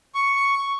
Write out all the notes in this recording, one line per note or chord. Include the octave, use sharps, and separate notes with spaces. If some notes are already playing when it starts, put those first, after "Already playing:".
C#6